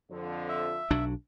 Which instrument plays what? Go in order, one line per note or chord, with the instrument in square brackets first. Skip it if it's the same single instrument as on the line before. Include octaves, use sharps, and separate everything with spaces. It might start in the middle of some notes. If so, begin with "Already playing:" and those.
[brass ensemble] F2 D3 F3
[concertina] E5
[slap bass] B1 F#3 D4